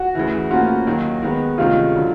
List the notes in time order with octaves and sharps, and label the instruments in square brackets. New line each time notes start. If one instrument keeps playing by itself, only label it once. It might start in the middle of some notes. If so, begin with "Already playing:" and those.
Already playing: [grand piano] F#4
[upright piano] D2 C#3 E3
[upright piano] A2 F3 A#3 C#4 F4 [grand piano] F#4
[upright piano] D#2 D#3 F#3
D#3 G#3 B3
[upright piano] D2 C3 D#3 G#3 C#4 [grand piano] F4
[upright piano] D3 F#3